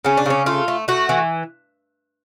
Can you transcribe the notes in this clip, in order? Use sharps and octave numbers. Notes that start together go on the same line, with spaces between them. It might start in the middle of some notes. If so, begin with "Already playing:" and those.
C#3 C#4
D4
C#3 C#4
A3 F4
A3
A3 F#4
E3